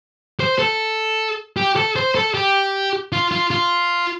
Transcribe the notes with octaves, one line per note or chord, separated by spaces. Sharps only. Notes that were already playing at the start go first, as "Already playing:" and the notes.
C5
A4
G4
A4
C5
A4
G4
F4
F4
F4